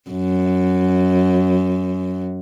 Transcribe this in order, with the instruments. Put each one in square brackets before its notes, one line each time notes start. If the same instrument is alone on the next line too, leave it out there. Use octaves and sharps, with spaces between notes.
[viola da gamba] F#2